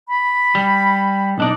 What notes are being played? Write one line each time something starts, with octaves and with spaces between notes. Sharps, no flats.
B5
G3
B1 D4 D#4 D5